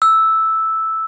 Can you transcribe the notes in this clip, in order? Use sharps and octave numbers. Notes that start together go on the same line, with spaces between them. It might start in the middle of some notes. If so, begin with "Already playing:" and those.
E6